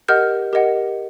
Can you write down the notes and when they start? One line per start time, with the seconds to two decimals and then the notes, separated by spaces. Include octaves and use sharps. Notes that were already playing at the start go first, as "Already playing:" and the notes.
0.08 G4 A#4 D#5 F#5 F6 G6
0.53 G4 A#4 D#5 F#5